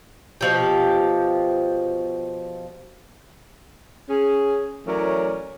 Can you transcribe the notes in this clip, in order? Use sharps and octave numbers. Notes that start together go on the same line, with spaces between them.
B2 F3 G4
C#4 G#4
E3 F#3 A3 C#4 A#4 D5